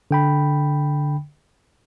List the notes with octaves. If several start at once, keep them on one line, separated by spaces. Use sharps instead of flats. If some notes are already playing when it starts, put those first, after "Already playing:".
D3 G5 B5